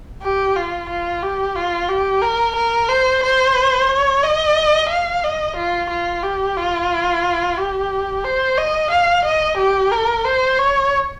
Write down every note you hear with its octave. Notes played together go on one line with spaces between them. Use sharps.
G4
F4
F4
G4
F4
G4
A#4
A#4
C5
C5
C#5
D#5
F5
D#5
F4
F4
G4
F4
G4
C5
D#5
F5
D#5
G4
A#4
C5
C#5